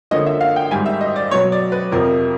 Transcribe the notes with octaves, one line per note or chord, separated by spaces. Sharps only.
D3 F3 A#3 C#4 D#5
E5
F5
G5
G#2 D#3 G3 G#5
E5
D#5
D5
B2 F#3 B3 C#5
D5
B4
F2 C3 F3 A#4